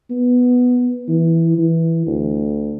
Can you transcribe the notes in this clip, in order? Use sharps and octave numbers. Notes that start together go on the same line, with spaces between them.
B3
E3
E3
D2